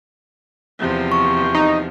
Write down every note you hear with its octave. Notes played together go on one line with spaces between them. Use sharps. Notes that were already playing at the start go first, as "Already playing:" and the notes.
E2 C3 F3
C#6
D#4